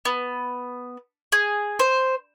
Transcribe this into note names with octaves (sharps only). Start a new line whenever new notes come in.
B3
G#4
C5